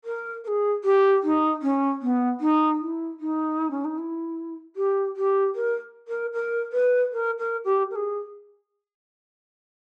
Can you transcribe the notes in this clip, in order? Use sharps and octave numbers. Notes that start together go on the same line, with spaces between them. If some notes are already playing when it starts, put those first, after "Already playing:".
A#4
A#4
G#4
G4
D#4
C#4
B3
D#4
E4
D#4
C#4
D#4
E4
G4
G4
A#4
A#4
A#4
B4
A#4
A#4
G4
A#4
G#4